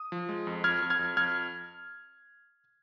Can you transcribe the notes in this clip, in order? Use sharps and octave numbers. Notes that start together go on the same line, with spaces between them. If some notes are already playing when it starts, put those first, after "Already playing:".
Already playing: D#6
F3
G#3
F2
F2 F6 G#6
F2
F6 G#6
F2
F2 F6 G#6